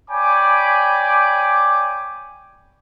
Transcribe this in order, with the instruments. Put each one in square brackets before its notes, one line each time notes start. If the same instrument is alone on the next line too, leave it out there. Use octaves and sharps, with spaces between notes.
[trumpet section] C#5 D5 G5 G#5 B5 D6